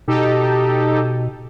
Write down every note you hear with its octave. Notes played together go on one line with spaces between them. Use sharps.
B2 D#4 G4 A4